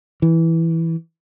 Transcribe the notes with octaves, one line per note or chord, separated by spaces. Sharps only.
E3